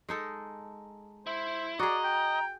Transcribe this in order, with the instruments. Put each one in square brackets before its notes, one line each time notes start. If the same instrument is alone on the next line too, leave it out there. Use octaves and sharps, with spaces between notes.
[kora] G#3 D#4 A4
[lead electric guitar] E4 [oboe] C5
[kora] F#4 G#4 [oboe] D5 [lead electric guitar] D#5 [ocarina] A#5
[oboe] G5